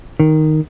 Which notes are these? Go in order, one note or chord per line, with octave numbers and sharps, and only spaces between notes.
D#3